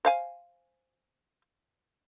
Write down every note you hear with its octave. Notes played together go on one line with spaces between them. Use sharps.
C5 F5 G#5